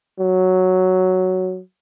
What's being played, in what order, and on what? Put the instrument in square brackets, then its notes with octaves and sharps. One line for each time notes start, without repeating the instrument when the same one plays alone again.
[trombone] F#3